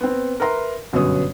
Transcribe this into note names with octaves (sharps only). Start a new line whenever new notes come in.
B3 C4
A#4 B4 E5 A#5 C6
G1 F#2 B2 B3 C#5 D#6